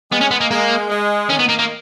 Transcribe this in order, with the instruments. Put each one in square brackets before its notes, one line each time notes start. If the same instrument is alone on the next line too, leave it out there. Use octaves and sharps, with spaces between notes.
[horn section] G#3 [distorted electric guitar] B3
[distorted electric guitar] C#4
B3
A#3
[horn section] G#3 [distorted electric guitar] A#3
[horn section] G#3
[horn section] D#3 [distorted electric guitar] C#4
[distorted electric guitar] B3
A#3
A#3